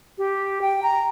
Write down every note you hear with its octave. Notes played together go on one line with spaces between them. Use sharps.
G4
G5
A#5